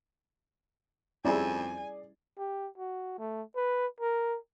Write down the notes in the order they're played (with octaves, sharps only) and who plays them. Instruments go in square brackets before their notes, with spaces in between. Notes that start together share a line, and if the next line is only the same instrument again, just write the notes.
[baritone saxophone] F2 [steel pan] G3 C#4 E4 [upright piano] G#4 D5 [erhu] G#5
[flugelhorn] G4
F#4
A3
B4
A#4